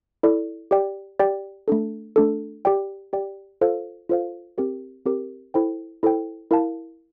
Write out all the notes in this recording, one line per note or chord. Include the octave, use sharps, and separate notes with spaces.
E4 A4 D5
G4 D5 G5
G4 D5 G5
A3 D4 A4
A3 D4 A4
G4 D5 G5
G4 D5 G5
F4 A4 C5 F5
F4 A4 C5 F5
C4 G4 A#4
C4 G4 A#4
E4 A4 C5 G5
E4 A4 C5 G5
E4 A#4 F5 A5